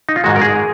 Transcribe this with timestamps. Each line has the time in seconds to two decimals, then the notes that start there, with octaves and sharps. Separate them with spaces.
0.09 D#4
0.16 F4
0.24 G#2 D#3 G#3 F#4
0.36 A#4
0.41 G#4